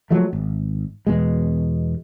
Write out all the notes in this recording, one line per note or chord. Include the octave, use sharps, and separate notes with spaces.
F3 F#3 G#3 A3
G#1
E2 B2 G#3